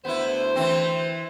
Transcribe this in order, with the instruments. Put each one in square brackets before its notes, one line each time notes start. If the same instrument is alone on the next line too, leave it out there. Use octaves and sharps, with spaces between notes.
[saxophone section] D2 C5 [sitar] B3 E4
[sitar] E3 C4